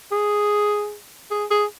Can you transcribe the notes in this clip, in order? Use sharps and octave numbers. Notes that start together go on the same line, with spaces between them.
G#4
G#4
G#4